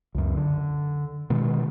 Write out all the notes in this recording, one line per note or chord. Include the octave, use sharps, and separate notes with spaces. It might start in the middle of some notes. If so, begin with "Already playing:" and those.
C#2 F#2
D3
B2 D#3 G#3